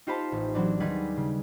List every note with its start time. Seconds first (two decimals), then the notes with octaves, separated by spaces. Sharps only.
0.07 D#4 F4 G4 C5 A5 B5
0.32 A1
0.54 E3 F#3 C4 D4
0.80 D#2 G3 D#4 G#4 B4
1.17 C#3